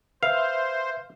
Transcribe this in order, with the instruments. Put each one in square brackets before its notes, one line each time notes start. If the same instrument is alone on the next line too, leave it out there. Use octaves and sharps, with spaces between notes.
[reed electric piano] B4 E5 [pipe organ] C5 [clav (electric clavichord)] F5